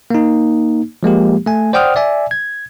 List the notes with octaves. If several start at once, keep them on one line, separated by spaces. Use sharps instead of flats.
A#3 D#4
F3 G#3 A#3 G4
A3 G#5
C5 D5 F#5 G5 D#6 F6
D5 E5 G#5
G#6